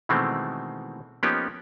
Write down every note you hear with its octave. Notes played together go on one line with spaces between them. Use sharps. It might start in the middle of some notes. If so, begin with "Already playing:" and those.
B2 D#3 E3 G#3 A3 C4
F3 A#3 B3 C#4 D#4 G4